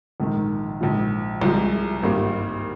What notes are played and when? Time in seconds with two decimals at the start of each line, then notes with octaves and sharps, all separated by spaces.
0.20 A#1 G#2 D#3
0.81 A#1 G#2 F3
1.42 C2 C3 F3 G#3
2.03 G#1 G2 G3 A#3